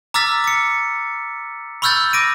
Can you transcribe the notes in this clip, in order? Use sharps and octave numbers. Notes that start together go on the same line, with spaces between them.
A#5 D6 E6 F6 A6 B6
D6 C#7
B5 C#6 E6 F6 G6 A6
D6 A#6 D7 D#7